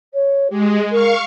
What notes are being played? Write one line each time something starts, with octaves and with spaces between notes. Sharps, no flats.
C#5
G#3 G4
A#4 F5 C#6